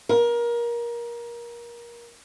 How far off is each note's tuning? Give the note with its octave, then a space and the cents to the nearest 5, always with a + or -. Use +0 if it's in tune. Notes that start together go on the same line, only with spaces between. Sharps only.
A#4 +25